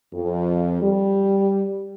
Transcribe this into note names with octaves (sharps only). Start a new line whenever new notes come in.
F2
G3